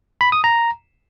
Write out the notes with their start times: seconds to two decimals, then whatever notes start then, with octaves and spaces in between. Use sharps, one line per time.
0.21 B5
0.32 D#6
0.44 A#5